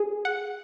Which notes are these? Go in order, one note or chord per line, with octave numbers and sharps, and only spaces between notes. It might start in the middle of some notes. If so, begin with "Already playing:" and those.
Already playing: G#4
F#5